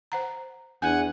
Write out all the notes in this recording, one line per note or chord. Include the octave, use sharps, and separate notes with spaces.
C5 F#5 A#5
E2 D4 F#5 G#5